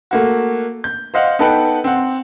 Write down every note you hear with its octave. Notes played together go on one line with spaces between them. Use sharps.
A3 A#3 F#4
G6
C5 D#5 F5 F#5
B3 D#4 A4 B4 F#5 G5
C4 F#5